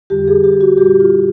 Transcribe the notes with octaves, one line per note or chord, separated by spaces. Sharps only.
F2 D3 G3 G4
G#4
G4
F#4
A#2 G3 G4
F4